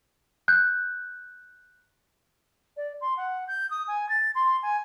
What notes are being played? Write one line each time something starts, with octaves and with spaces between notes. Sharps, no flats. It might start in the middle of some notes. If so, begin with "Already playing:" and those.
F#6 G6
D5
C6
F#5
G6
D#6
G#5
A6
C6
G#5